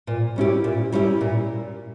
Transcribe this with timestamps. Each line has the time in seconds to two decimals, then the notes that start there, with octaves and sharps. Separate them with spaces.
0.07 A#2
0.36 G3 C#4 E4 G4
0.64 A#2
0.92 G3 C#4 E4 G4
1.21 A#2